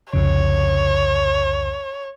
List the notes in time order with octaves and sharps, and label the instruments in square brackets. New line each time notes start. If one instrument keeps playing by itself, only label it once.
[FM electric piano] C2 F2 C#3 [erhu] C#5